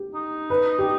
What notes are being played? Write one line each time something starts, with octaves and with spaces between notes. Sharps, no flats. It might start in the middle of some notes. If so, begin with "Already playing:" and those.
Already playing: G4
D#4
B4
G4